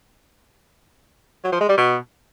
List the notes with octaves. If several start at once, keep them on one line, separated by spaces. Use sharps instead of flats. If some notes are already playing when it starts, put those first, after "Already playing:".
F#3
F3
G#3
G3
B2